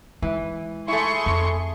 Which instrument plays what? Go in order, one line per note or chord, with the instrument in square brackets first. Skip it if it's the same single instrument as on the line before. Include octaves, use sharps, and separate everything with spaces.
[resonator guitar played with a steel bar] E3 [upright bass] G#3
[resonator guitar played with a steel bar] A3 E4 [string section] G#4 C6 C#6
[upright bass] F2